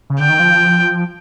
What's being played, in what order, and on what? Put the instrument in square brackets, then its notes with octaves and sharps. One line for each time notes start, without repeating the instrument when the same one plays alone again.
[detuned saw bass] C#3
[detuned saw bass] D3 [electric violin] G5
[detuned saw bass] D#3
F3